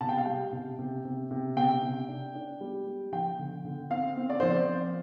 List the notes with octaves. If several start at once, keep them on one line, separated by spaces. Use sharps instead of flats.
C3 A5
G5
F5
G3 G5
C3
C3
C3
C3
C3 G5
C3
D4
D4
G3
G3
F3 G5
D3
D3
C4 F5
C4
D5
F3 C5
D5
C4